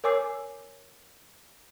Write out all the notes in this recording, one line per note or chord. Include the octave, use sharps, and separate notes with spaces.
A#4 C#5 G#5 D6 E6 C7